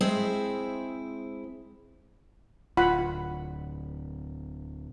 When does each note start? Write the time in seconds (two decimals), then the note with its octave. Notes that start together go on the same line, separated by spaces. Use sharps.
0.01 G#3 C4 E4 G#4 C5 E5
2.77 D1 F4 F#5 B5